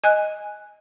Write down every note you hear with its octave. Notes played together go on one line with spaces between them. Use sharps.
D#5 G#5 F#6